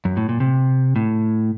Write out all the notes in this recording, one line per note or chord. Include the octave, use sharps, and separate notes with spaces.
F#2
A2
A#2
C3
A2